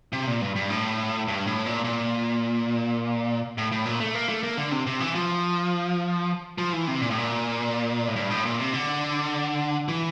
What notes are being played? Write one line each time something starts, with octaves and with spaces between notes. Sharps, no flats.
C3
A#2
G2
G2
A2
G2
A2
A#2
A#2
A2
A2
A#2
A3
A#3
A3
A#3
D3
C3
C3
E3
F3
F3
E3
C3
A#2
A2
A#2
A2
G2
A2
A#2
C3
D3
E3